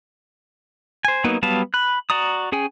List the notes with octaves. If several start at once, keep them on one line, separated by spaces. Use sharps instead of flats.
C5 G#5
F#3 A#3 B3 D#4
F#3 G3 B3 F5 A5
B5 F#6
F#4 D5 A#5 D#6
C#4 G#4 G5 G#5